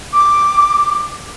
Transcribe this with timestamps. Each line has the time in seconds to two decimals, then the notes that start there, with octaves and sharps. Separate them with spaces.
0.14 D6